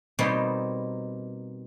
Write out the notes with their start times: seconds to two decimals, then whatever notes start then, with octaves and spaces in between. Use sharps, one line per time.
0.19 B2 G3 A#3 C4 D#4